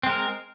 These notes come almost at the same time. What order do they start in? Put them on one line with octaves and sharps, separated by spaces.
C4 G#3 A#4